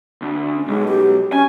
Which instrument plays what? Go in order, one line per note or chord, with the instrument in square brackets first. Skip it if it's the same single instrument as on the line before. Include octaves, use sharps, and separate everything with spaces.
[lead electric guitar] D2
[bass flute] C#4
[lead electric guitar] B1 [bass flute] G#3
[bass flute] G4
[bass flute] C#4 [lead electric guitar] G#5